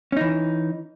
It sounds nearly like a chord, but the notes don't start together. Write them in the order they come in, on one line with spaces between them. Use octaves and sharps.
C#4 D#4 E3